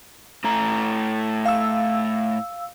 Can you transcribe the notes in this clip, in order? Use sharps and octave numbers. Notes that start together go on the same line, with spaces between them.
A2 A3 A#5
F5 E6